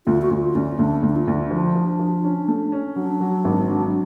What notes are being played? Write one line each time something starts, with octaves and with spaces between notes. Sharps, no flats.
D2 F4
F#4
D2 F4
D2 C#4
D2 D4
D2
D4
F4
D2
D4
F3 D4
F3
F3
C#4
A3
C#4
F#3 D4
F#3
G#1
F#3